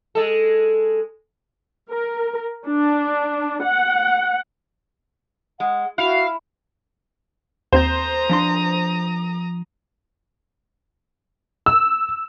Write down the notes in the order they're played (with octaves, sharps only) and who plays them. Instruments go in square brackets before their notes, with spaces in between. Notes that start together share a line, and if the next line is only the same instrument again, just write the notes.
[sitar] G#3 A4
[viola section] A#4
D4
F#5
[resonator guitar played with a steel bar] G#3 [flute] F#5
[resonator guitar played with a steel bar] E4 [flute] F#4 [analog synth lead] F5
[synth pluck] D#2 C4 G6 [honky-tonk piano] C5 [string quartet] A#5 D#6
[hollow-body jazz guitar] F3 D4 C6
[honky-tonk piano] E6